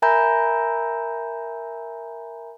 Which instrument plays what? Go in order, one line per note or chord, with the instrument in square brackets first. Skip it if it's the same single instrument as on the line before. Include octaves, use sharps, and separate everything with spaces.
[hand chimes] A#4 E5 G#5 A#5 B5 G6